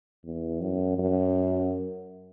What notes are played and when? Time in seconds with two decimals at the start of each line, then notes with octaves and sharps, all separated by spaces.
0.25 E2
0.61 F#2
0.98 F#2